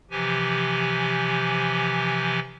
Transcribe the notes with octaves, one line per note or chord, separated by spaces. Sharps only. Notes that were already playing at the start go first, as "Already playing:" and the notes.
C3 E3 F3 G4 G#5